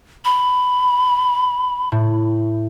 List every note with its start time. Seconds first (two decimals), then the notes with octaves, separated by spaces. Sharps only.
0.25 B5
1.92 A2